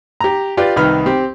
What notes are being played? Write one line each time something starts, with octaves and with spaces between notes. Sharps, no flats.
G4 A#5
F4 G4 B4 D5
C2 D#3 D#4 B4 B5 F6
C4 G4